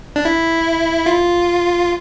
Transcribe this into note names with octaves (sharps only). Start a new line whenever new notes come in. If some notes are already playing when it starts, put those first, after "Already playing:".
D4
E4
F4